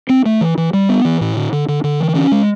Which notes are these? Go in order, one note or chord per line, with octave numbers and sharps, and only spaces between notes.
C4
A3
E3
E3
G3
B3
E3
A2
D3
D3
D3
D3
E3
C#4
G#3